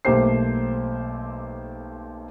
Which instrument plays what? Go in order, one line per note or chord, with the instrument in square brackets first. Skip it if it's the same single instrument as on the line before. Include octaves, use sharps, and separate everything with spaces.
[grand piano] B1 A3 A#3 G4 C5 C7